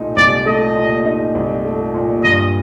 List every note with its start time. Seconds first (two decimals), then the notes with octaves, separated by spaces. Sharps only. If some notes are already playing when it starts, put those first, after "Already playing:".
Already playing: C2 A#2 A3 D#4
0.16 C2 D5
0.46 A3 D#5
0.75 A#2
1.05 D#4
1.35 C2
1.65 A3
1.94 A#2
2.23 G2 D#5